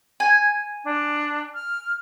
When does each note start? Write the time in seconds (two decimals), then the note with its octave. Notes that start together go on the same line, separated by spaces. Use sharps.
0.20 G#5
0.85 D4
1.55 F6